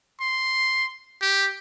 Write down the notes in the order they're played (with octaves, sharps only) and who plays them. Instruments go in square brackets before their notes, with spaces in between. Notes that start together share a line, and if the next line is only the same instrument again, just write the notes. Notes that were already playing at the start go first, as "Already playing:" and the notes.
[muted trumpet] C6
G4